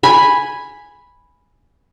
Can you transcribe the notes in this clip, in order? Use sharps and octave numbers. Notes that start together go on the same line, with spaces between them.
G#5 B5